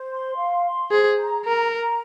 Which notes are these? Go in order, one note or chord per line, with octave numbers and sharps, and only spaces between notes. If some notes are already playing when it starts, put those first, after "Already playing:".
Already playing: C5
C6
F5
C6
G#4 C5
A#5
A#4 A#5
A#5